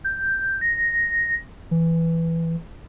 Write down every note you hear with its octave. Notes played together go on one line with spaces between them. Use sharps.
G6
A#6
E3